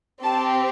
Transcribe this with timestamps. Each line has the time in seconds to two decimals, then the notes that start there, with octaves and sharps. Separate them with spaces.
0.23 C4 G4 A5